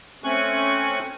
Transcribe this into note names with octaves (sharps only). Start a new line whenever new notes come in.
A3 C4 C#4 G#5 C#6 F#6